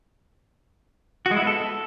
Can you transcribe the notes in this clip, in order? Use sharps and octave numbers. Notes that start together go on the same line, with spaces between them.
F#4
G#3
E4
B3
A4